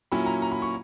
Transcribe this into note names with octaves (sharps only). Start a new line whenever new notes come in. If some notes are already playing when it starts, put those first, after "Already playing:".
A#2 F#3 C#4 E4 B5
A#5
A#5
B5
C#6